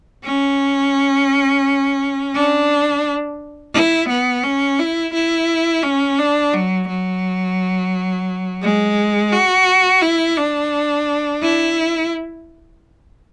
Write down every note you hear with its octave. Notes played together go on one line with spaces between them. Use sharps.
C#4
D4
E4
B3
C#4
E4
E4
C#4
D4
F#3
F#3
G#3
F#4
E4
D4
E4